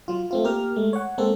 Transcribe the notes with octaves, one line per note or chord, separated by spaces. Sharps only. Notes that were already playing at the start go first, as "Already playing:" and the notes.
F#3 F4
A3 C4 F4
A#3 G4 A#4 F6
G#3 A3
C#5 F#5
G#3 A#3 C4 A4